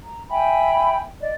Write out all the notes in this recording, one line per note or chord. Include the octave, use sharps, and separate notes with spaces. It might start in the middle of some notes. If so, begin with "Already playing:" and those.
A#5
E5 G5 G#5 B5
D5 D#5